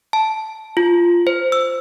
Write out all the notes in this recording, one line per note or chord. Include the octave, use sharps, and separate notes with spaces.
A5
F4
C5
E6